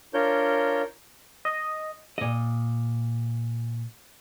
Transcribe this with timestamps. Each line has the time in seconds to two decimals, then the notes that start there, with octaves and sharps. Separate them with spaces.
0.14 D4 F4 A#4 C#5 G6
1.45 D#5
2.18 A#2 D#5